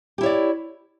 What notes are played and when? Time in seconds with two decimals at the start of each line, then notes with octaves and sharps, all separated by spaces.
0.18 G4
0.21 E4
0.23 C#5
0.26 D5